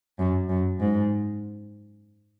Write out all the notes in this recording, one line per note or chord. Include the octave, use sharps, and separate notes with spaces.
F#2
F#2
G#2